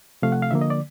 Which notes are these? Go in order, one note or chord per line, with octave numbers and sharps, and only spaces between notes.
C3 F3 A3 F5
F#5
F5
D3 F3 A#3 E5
D#5
D5